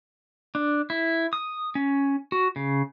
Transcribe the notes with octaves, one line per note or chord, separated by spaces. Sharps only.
D4
E4
D#6
C#4
F#4
C#3